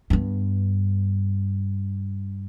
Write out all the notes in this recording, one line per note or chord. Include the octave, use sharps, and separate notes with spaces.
G2 B3